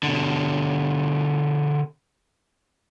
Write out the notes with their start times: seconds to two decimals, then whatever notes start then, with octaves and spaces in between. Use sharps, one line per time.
0.03 B2 D3